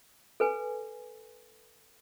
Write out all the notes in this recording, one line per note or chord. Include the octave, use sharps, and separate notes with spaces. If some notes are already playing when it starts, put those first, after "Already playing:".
A4 B4 G#5